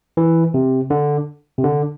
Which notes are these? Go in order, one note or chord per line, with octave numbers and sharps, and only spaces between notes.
E3
C3
D3
C3
D3